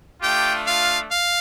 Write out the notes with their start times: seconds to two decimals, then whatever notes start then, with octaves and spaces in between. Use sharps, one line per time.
0.22 A3 D4 F4 G4 G5
0.67 F4 F5
1.11 F5